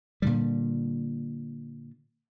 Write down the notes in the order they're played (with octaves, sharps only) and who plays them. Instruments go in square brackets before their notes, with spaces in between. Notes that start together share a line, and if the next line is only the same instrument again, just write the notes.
[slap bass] A#2 D3 G3